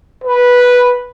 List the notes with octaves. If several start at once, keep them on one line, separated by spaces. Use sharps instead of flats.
B4